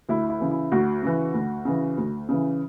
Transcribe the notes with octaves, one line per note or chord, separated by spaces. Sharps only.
D2 E4
E4
C#3 E3
E4
D2 F#4
C#3 E3
D2
C#3 E3
D2
C#3 E3